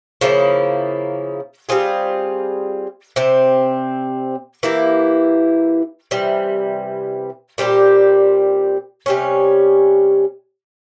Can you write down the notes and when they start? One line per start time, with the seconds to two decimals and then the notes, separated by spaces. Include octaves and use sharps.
0.21 C#3 F3 A#3 E4
1.69 G3 C4 F4 G#4
3.16 C3 G3 C4
4.63 E3 A#3 E4 G4
6.11 C3 E3 G3
7.58 A#2 G3 C4 G4
9.06 C3 G3 C#4